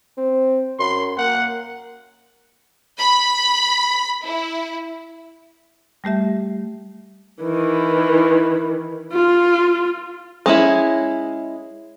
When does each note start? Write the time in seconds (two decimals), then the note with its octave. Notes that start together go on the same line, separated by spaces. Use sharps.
0.17 C4
0.79 F#2 C6
1.18 A#3 F#5
2.99 B5
4.24 E4
6.04 G3 A3 G4 E5
7.42 D#3 E3
9.13 F4
10.46 G#3 C#4 E4